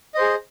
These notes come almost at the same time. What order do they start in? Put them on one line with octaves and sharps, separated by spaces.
D#5 C5 G#4